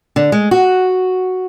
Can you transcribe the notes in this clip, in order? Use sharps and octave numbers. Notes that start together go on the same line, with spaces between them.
D3
G#3
F#4